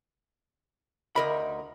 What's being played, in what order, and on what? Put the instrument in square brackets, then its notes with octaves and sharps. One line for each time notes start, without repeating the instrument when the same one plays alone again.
[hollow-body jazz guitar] D2 A#4 B5 [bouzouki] D#4 D#5 E5